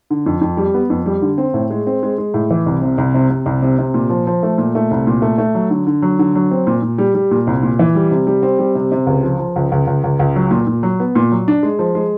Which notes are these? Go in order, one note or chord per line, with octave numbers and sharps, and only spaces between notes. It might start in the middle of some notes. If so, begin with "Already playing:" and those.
D3
F2
F2
G3
B3
F2
G3
D3
C4
A2
G#3
C4
G#3
G#3
A2
E3
C2
C3
C2
C3
C3
C2
C3
C3
A#2
F3
F3
A3
A#2
A3
C2
A#2
A3
A3
F#3
D3
D3
F#3
D3
F#3
C4
A#2
A#2
G3
G3
A#2
C2
A#2
E3
G3
C3
G3
C4
G3
C3
C3
C#2
F3
F3
C#2
C#2
C#2
C#2
C#2
F#3
A#2
A#2
F#3
B3
A#2
F#3
D4
G#3
F3
G#3